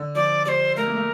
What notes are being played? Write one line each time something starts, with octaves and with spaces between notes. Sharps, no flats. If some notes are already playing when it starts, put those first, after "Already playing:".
Already playing: D3
F3 D5
G3 C5 D5
A3 A#4
A#3
A3